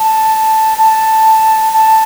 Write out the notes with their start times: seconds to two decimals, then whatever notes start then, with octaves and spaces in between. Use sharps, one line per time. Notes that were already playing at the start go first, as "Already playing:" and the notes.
Already playing: A5
0.78 A5
1.73 A5